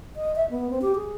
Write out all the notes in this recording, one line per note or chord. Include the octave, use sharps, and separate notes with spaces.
D#5
E5
B3
C4
G4
G#4